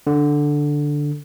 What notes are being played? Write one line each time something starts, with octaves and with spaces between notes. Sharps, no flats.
D3